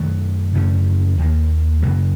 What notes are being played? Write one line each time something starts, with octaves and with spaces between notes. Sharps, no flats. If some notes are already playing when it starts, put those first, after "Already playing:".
Already playing: F#2 D#3 F#3 A3
F#2 C#3 A3 C#4
D#2 D#3 A#3
F#2 C#3 F#3 A#3